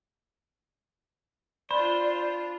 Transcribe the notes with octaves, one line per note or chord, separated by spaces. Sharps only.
D4 F4 C5 D5 B5